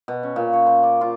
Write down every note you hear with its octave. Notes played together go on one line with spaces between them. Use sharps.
B2
C#4
A#2
C#5
C5
D5
F4